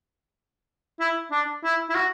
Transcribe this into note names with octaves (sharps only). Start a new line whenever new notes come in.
E4
D4
E4
E4
F#4